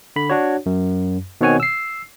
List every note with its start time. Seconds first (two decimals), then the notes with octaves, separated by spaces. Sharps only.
0.16 D3 B5
0.30 D4 F#4 C#5
0.66 F#2
1.41 B2 D#3 C4 C#5 F#5 G#5
1.60 E6 C7